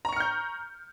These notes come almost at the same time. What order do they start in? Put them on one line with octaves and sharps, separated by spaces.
A#5 C#6 C#7 F6 G6